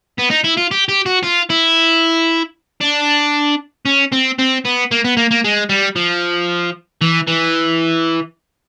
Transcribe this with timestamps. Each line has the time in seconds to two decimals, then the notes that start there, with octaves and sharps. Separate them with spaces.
0.19 B3
0.31 D#4
0.44 E4
0.57 F4
0.71 G4
0.89 G4
1.06 F#4
1.23 F4
1.50 E4
2.81 D4
3.85 C#4
4.12 C4
4.39 C4
4.65 B3
4.91 A#3
5.05 B3
5.17 A#3
5.31 A#3
5.44 G#3
5.69 G3
5.96 F3
7.01 E3
7.27 E3